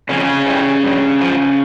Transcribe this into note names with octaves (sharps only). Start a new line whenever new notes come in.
F2 C#3 C#4
E3 G3
G2
F3